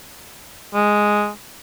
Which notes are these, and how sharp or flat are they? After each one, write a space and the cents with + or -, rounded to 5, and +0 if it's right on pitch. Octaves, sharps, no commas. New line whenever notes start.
G#3 +0